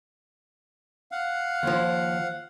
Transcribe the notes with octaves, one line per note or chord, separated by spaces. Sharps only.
F5 F#5
D#2 F3